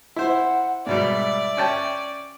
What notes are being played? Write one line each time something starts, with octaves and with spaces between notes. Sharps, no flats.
E4 C5 F#5
G#2 B2 G3 D5 E5
C#4 G5 A5